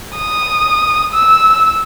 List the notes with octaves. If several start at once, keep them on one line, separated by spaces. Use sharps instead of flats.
D#6
E6